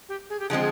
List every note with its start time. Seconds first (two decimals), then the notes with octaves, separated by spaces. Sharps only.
0.09 G4
0.30 G#4
0.40 G4
0.49 D3 F3 G#3 C4 G#4